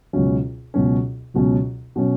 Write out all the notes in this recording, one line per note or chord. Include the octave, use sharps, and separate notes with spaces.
C#2 B2 F#3 C#4
C#2 B2 F#3 C#4
C#2 B2 F#3 C#4
B2 F#3 C#4